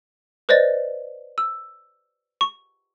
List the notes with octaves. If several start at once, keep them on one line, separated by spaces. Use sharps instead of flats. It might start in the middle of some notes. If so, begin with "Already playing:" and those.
B4 C5 D5 D#5 A6
E6
C#6